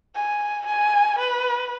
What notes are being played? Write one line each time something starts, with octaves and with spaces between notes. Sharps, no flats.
G#5
G#5
B4